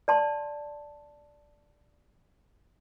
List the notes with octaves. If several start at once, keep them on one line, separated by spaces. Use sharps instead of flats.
D5 A5 C6